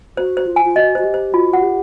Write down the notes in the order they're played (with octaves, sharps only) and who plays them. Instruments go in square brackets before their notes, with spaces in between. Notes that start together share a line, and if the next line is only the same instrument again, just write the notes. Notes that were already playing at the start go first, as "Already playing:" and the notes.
[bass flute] F#4 [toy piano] C5
[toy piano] C5
[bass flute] F4
[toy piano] G#5
[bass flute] F4
[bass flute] F#4 [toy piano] D#5
[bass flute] F#4 [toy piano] C5
[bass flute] G4
[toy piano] C5
[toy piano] F4 [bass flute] F#4
[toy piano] F#5
[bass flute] G4